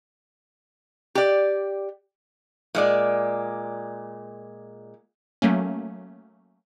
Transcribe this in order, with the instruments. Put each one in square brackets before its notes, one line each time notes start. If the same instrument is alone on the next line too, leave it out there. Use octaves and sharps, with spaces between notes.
[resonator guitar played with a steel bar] G4 D5
A#2 G#3 D5
[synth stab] F#3 A3 A#3 C#4